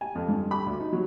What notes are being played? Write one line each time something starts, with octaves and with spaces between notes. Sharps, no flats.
G#5
F2
G2
B5
D2
D#4
F#3